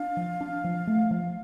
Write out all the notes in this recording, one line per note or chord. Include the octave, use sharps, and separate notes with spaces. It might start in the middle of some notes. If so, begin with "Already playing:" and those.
Already playing: D4 F5
F3
D4
F3
A3
F3